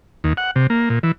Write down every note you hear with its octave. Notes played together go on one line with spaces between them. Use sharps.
D#2
F#5
C3
A#3
A#2
E3